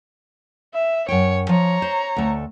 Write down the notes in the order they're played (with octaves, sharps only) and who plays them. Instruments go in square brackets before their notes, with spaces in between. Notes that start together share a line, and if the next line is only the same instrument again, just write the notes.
[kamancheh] E5
[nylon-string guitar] F#2 G5 [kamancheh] C#5
[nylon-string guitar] F3 [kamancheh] C#5 A#5
[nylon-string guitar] C5
D2 A3